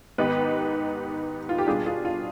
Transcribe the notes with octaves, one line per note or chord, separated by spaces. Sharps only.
G#2 D#3 B3 D#4 G4 B4
F4
G4
B2 G3 D4 F4 G#4
F4 G#4
F4